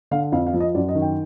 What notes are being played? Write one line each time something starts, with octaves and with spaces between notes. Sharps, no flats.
D3 F5
F2 F5
F5
F3
D#5
F#2 D5
D#5
D#3
G5